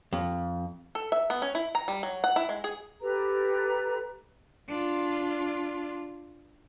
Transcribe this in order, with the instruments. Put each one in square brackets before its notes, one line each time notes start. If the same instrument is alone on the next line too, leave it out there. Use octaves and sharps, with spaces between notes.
[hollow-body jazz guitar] F2
[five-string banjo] A4
E5
B3
C#4
E4
A#5
G3
F#3
F#5
E4
G#3
G#4
[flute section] G4 A4 B4 A#5
[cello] D4 F4